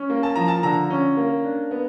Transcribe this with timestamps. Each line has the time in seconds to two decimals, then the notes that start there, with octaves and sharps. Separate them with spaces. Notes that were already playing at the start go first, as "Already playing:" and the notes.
Already playing: C#4
0.10 A#3
0.23 A5
0.36 F3 A#5
0.48 A5
0.63 D3 A#5
0.90 C#4
1.17 A#3
1.44 D4
1.71 B3